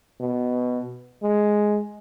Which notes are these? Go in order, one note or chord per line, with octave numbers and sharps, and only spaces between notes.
B2
G#3